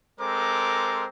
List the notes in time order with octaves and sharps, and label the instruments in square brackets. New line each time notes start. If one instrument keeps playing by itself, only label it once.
[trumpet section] G#3 C4 A4 A#4 C5 D6